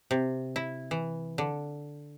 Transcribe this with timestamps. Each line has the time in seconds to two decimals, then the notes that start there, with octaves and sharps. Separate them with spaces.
0.11 C3
0.56 E4
0.91 E3
1.38 D3